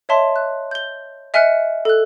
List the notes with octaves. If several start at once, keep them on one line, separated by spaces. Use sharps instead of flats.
C#5 D#5 E5 A5 C6
F#6
G6 G7
D#5 E5 G#5 F6 F#6 C#7
A4 F#6